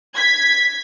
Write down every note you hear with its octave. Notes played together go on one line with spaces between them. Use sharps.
G#6 B6